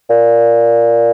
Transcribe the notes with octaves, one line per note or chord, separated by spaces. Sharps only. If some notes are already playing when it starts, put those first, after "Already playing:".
A#2